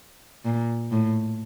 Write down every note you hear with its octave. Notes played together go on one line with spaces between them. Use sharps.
A#2
A2